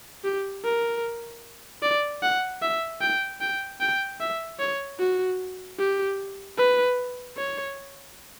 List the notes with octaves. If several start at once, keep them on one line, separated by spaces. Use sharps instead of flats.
G4
A#4
D5
F#5
E5
G5
G5
G5
E5
C#5
F#4
G4
B4
C#5